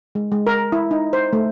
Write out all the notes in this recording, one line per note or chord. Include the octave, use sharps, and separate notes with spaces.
G#3
G#3
A#4
E4
D#4
C5
A3